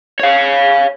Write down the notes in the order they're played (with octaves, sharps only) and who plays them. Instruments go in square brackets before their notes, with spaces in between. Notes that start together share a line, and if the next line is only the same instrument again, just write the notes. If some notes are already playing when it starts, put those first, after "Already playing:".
[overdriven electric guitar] C#5 F5